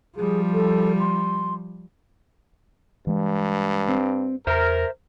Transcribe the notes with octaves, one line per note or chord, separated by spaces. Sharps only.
F3 G3 G#4
A4
C6
G2 E3 G#3
C4
E2 A#4 C5 E5